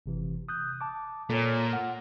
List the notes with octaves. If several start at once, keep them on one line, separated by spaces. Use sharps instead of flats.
G1 C3 E3
D#6 F#6 G6
A5 D6
A#2 A4 C#5
F#5 F6